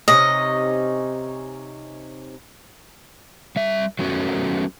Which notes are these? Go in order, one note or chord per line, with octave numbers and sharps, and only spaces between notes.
C3 C#4 D#4 D#5
G3 E5
F#3 A3 B3 C#4 F#4